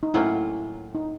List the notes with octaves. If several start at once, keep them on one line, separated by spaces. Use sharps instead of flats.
D#4
A2 F#3 A#3 C#4 E4 F4
D#4